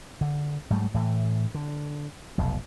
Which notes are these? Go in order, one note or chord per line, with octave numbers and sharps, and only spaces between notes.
D3
G#2 F#3 G3 A3
A2 E3
D3
F1 B1